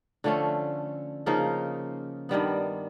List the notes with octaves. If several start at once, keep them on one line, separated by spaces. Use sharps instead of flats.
D3 F3 A3 C#4
C#3 F3 A#3 D#4
G2 D#3 G3 B3